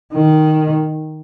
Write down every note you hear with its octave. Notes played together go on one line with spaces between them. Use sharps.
D#3